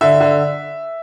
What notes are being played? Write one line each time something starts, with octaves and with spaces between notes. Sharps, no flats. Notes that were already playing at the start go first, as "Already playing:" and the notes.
D3 E5
D3